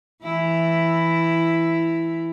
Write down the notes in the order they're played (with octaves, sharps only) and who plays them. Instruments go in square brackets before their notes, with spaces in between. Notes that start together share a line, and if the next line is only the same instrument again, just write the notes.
[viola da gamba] E3 E4